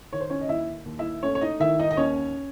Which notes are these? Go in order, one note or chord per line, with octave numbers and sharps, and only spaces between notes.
D#3 C#5
C5
C#4 C#5
D#5
D#2 E4 E5
D#2
E4 E5
A3 C#4 C#5
C#5
D#4 D#5
D#3 E4 E5
D#4 D#5
D#5
D#2 C#4 C#5